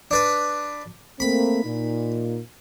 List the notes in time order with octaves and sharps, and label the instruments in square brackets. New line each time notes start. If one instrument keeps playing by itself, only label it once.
[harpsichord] D4 B4
[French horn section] A3 A#3 C4 [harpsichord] B5
[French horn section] A#2 D#4